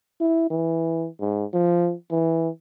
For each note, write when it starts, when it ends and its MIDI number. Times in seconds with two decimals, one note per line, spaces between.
0.21 0.46 64
0.51 1.07 52
1.20 1.45 44
1.53 1.94 53
2.11 2.49 52